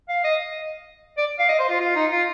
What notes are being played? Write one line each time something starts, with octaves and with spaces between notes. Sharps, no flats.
F5
D#5
D5
F5
D#5
C5
F4
F4
D#4
F4